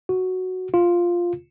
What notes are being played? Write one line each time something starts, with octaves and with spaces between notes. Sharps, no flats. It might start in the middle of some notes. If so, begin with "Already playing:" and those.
F#4
F4